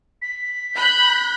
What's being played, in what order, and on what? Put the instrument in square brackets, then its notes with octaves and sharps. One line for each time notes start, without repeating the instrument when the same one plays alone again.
[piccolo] B6
[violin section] B5 F#6 G6